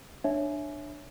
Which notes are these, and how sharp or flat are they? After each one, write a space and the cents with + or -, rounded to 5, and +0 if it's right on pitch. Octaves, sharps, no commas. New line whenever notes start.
D4 +15 C#5 +0 E5 +0